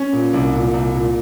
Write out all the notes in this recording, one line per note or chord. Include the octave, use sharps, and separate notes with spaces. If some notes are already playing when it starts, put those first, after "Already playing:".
Already playing: C#4
A#2
C2
A#2
C2
A#2